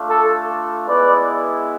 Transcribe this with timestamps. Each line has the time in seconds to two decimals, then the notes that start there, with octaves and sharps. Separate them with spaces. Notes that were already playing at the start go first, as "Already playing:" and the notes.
Already playing: A3 D4 F4
0.09 A4
0.88 G#3 B3 E4 B4 D5